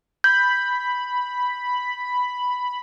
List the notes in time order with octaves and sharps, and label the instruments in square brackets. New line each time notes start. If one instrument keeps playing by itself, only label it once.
[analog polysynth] B5 [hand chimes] G6